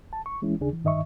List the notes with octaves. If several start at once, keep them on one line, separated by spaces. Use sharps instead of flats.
A5
C#6
E3 G#3 C#4 E4
D#2 C#3 D4 G#4
E3
G2 D#3 D#5 E5 C#6